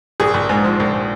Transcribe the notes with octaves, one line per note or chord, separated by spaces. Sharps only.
A#1 G#4
A#1
G#2
F3
A#1